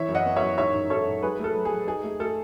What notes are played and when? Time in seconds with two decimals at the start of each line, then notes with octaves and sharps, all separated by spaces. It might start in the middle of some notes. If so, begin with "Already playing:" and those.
Already playing: E3 C#5 E5
0.09 F#2
0.15 D#5 F#5
0.25 B3
0.36 C#5 E5
0.42 F#2
0.58 G#2 C#5 E5
0.74 G#2
0.90 G#2 A4 C#5
1.07 G#2
1.23 F#3 G#4 B4
1.39 A3 A4
1.55 F#3
1.65 G#4
1.71 F#3
1.87 D#4 G#4
2.04 A3
2.20 A3 A4